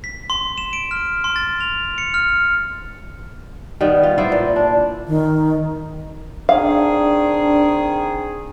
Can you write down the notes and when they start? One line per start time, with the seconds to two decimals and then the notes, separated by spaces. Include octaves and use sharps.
0.04 B6
0.30 C6
0.58 E7
0.73 D7
0.91 F6
1.24 C6
1.36 A6
1.61 F7
1.98 C#7
2.14 F6
3.81 D#3 G3 B3
4.03 F4
4.18 B3 E4 C5 D5
4.32 A#2
4.56 D4
5.08 D#3
6.49 D#3 C4 D4 G#4 F5